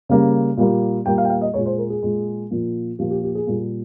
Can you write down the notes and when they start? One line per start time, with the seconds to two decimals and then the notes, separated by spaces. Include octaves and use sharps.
0.09 C#3 G3 A#3
0.57 A#2 G3 A#3
1.06 A#2 G3 A#3 G5
1.18 F5
1.25 G5
1.30 F5
1.41 D#5
1.54 G#3 C#5
1.58 A#2
1.66 C5
1.78 A#4
1.90 G#4
2.02 A#2 G#3
2.50 A#2 F3 A#3
2.99 A#2 F3 A#3 G4
3.10 G4
3.23 G4
3.35 G#4
3.47 A#2 G3 A#3